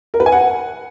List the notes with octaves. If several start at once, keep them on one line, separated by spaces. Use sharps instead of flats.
A#4
B4
G#5
F#5